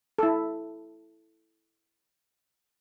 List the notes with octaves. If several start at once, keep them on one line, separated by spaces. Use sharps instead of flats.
E4 A4